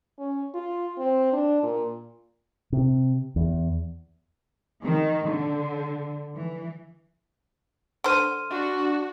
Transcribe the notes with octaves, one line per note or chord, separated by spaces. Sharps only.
C#4
F4
C4
D4
A#2
C3
E2
D#3
D3
E3
D3 C5 C6 F6 D#7
D4 F#4